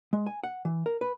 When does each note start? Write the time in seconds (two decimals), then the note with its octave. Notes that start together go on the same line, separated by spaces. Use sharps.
0.13 G#3
0.26 G#5
0.44 F#5
0.65 E3
0.86 A#4
1.01 B4